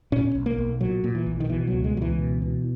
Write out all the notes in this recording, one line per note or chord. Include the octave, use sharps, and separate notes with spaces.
A#2 C#4
B1
A#3
B1
A#2 F#3
A#2
E3
B1
D#3
B2 E3
F#3
C#2
G#3
C#2 F#3
E3
B2
B2